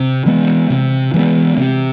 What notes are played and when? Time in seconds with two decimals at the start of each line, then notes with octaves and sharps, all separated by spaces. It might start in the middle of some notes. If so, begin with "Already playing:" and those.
Already playing: C3
0.26 E3 G#3 B3
0.70 C3
1.14 E3 G#3 B3
1.57 C3